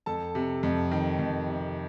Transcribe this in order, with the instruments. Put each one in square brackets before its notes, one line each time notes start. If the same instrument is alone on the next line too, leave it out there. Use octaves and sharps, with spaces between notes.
[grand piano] F2 A4 A5
C3
F2
D#3
F2
C3